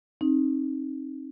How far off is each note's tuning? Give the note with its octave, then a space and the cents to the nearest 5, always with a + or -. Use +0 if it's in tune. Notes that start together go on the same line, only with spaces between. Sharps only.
C4 +35 D#4 +0